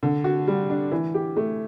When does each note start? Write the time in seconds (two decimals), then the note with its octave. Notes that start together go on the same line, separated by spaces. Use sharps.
0.03 D3
0.24 F#4
0.47 G3
0.70 D4
0.92 E3
1.14 G4
1.36 A3